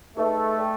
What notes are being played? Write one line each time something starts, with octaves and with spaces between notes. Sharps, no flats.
A3 D#4 G#4 B4 D#5
A4 D5 G5